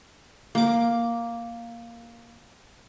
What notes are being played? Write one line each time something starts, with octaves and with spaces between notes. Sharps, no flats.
A#3 D6